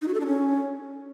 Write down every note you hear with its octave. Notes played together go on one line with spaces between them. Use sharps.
D#4
F#4
A4
D4
C#4